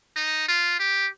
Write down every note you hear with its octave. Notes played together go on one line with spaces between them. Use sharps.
D#4
F4
G4